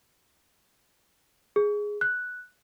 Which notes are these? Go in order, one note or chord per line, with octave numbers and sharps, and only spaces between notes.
G#4
F#6